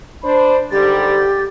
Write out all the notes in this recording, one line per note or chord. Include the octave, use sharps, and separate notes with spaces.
D4 C5 B5
G#2 D3 G3 G4 A6